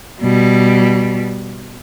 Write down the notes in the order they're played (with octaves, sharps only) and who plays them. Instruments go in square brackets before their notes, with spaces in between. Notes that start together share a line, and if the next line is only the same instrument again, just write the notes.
[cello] B2 G3